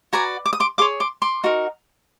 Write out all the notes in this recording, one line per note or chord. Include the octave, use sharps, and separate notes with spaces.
F#4 B4 D5 G#5 A#5
D6
D#6
C6 D6
G#4 C#5 C6 D6
C6 D6
C6 D6
D#4 F#4 A#4